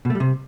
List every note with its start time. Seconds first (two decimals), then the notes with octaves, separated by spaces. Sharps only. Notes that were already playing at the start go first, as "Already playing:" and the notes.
0.05 B2
0.10 A3
0.15 G3
0.20 C3